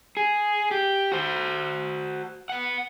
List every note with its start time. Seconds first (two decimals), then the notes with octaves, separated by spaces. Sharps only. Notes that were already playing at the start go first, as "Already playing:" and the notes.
0.17 G#4
0.71 G4
1.12 F#4 C5
2.49 B3 F#5